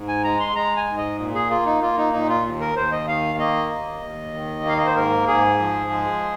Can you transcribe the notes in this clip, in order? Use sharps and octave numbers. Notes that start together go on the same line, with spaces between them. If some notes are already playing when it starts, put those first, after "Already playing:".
Already playing: G#2
G#5
G#3 A#5
C6
G#3 A#5
G#5
G#2
D#5
A#2
G#4
A#3 F4
D#4
A#3 F4
D#4
A#2 D#4
F4
D#2
A#4
D#2 C5
D#5
D#3 F5
A#3 D#5
D#2
D#2
D#3
A#3 F5
D#5
C5
G#2 A#4
G#2 G#4
F3
G#3